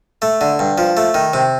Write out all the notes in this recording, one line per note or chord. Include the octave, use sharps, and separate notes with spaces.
A3
D3
G2
F3
A3
D#3
C3